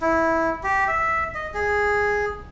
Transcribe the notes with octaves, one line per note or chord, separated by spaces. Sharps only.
E4
G4
E5
D#5
G#4